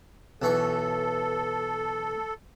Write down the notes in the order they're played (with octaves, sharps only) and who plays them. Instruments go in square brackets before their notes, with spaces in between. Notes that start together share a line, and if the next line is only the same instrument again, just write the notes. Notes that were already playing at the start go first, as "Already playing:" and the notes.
[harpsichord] B1 E3 C#6 [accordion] A4